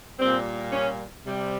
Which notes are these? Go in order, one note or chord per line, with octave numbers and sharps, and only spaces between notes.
A#2 G3 C4
C#4
C3 G3